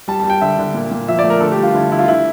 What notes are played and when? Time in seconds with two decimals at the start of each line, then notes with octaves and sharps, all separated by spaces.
0.08 G3 A5
0.20 G3 A5
0.30 G5
0.41 D3 E5
0.59 D3
0.74 A#2
0.91 A#2
1.08 F3 E5
1.19 D5
1.24 A3
1.30 A#4
1.41 D3 A4
1.52 G4
1.58 G3
1.63 F4
1.74 D3 E4
1.91 D3 E4
1.99 F4
2.08 D3 E4